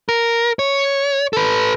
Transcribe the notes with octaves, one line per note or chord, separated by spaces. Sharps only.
A#4
C#5
A4 B4